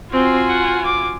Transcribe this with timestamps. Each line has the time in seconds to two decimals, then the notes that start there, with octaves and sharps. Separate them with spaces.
0.12 C4 F4 F#4 G#5
0.48 F#5
0.85 D6